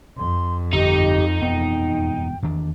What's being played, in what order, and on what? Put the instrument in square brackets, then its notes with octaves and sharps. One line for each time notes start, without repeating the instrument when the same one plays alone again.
[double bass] F2 [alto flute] C6
[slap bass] G1 A2 [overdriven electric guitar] D#4 [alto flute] G4
[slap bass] E1 G2 B3 [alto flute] G5
[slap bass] E2 D#3 D4